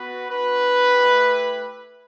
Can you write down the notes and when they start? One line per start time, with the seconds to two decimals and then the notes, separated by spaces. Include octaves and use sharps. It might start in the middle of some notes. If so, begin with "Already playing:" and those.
Already playing: B3 F#4 B4
0.29 B3 D4 F#4 B4
0.93 A3 E4 G4